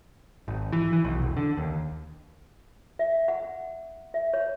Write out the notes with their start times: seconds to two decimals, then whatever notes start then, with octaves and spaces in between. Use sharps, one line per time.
0.48 G#1
0.73 E3
0.93 E3
1.05 B1
1.22 E1
1.37 D3
1.57 D#2
2.99 E5
3.28 F#5
4.14 E5
4.34 C#5